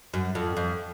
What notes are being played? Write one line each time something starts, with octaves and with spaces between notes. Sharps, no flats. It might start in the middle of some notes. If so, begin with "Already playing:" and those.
F#2
F2
F2